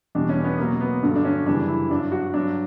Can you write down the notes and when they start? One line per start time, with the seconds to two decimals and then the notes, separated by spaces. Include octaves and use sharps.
0.15 E2 B2 G3 D4
0.29 C#4
0.44 B3
0.59 B2 F#3 A#3
0.81 B3
1.03 G2 D3 F#3
1.16 D4
1.25 C#4
1.46 F#2 C#3 E3 G3 D4
1.68 E4
1.90 G2 F#3 D4
2.12 F#4
2.34 G2 F#3 D4